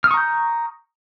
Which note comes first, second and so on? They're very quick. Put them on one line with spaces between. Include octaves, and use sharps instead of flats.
F6 D#6 C#6 A#5 G6